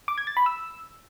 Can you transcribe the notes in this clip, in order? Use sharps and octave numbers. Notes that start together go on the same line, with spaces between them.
D6
G#6
A6
B5
E6